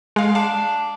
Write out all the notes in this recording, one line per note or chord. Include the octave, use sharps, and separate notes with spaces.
G#3 F5
D4 F5